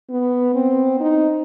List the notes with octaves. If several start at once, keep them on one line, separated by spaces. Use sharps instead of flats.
B3
C4
D#4